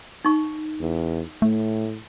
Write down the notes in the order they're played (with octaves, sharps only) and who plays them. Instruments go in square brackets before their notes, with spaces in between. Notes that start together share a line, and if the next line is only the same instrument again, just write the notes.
[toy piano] D#4 C#6
[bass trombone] E2
[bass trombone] A2 [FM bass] A3